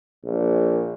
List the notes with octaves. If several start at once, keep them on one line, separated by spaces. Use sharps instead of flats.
A#1